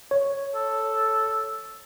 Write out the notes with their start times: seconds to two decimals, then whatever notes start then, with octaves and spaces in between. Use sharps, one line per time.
0.11 C#5
0.55 A4